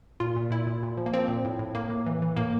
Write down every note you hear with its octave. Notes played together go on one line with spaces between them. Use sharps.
A#2 F4
A#2
A#2 E4
A#2
A#2
F3
A#3
F3 C4
A#2
A2
A2
A2 A#3
A2
E3
E3
A2 A#3